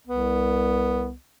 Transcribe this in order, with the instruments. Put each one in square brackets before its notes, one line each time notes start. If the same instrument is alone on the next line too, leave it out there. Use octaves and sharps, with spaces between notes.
[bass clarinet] C2 [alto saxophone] B3